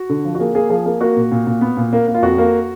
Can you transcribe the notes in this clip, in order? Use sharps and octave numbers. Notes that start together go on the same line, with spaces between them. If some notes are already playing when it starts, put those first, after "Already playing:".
Already playing: F#4
D3
F3
F#4
A#3 G#4
A#3 G#4
F3 G#4
A#3 G#4
A#3 F#4
A#2
A#2
A#2
B3
A#2
A#3
A#3
F4
F2 F#4
A#3